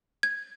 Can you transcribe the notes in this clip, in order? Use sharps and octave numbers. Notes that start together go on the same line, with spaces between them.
G#6